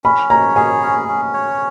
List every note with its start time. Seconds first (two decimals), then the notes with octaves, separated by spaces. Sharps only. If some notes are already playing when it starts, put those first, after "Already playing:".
0.04 C#4 B5
0.30 C#5 A#5
0.56 G#4 G#5
0.82 C#4
1.08 C#4
1.34 C#5